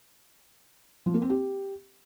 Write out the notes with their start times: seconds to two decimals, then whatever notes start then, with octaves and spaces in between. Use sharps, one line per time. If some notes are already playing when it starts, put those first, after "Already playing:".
1.06 F3
1.14 A#3
1.22 C4
1.30 G4